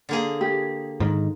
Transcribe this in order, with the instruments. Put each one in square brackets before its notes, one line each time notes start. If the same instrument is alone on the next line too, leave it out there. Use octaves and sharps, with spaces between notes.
[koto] D3 A#3 G#4
[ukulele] G4
[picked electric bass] G#2 D#3